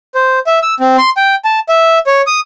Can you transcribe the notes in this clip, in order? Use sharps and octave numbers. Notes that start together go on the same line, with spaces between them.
C5
E5
E6
C4
C6
G5
A5
E5
C#5
D#6